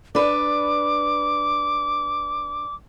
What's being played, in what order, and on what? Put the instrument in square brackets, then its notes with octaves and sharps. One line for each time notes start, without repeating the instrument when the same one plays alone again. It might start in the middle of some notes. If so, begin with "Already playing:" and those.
[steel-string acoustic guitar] D4 B4 [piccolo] D6